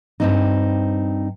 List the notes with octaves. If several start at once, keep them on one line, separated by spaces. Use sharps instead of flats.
G2 C4 D#4